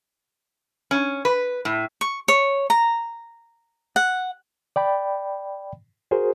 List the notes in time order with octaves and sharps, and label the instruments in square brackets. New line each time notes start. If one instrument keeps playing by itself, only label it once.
[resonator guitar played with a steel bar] C#4
B4
A2
[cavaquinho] C#6
C#5
A#5
F#5
[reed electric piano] D5 G5 B5
F#4 G#4 A#4 C5